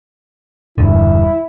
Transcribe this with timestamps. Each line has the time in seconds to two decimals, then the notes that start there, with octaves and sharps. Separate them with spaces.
0.78 E1 G2 D3 E4